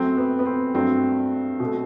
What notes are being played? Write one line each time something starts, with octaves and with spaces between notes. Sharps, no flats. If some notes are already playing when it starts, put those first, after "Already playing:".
Already playing: F#2 F#3 A3 C4
B3
B3
C4
G2 F#3 A3 C4
B2 A3